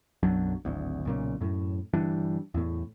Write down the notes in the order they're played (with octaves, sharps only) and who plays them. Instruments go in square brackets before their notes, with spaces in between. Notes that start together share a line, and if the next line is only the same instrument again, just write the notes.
[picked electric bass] B1 F#2 F#3 D4
D1 G#1 D2
B1 A#2 C#3
F#2 A2
G1 E3 G3 D4
E2 A2